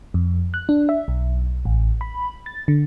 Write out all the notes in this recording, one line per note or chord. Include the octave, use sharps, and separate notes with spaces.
F2
F#6
D4
E5
B1
A1
B5
A6
D3